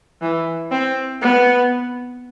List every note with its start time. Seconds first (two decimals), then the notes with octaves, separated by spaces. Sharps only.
0.22 E3
0.71 C4
1.22 B3